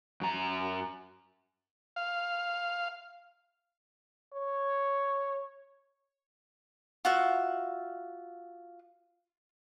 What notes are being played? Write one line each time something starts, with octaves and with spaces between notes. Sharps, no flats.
F#2 A#5
F5
C#5
F4 F#4 E5